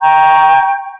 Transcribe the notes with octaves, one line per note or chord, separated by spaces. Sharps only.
G5 A#5 C#6 G6